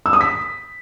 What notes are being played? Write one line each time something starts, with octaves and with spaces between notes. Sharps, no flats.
E6
D#6
B6